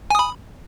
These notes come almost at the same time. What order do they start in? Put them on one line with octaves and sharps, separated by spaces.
G#5 D#6 B5